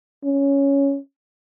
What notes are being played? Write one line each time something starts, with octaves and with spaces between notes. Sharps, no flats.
C#4